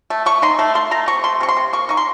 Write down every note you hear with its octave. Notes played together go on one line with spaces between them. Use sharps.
A3
A3 C#6
D#4 C6
A3
A3 C6
A3 A#5
C3 C#6
A3 C6
C3 C#6
C6
C3
A#3 C#6
D#4 C#6
C6